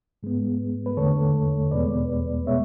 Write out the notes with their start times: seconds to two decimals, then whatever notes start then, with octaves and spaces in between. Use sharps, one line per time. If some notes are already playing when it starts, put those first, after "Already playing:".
0.23 G#2 G#3 B3
0.86 B4
0.97 E2 D3 A3 A4 C#5
1.71 E2 B2 G#3 B3 B4 D5
2.47 B2 G#3 B3 C#5 E5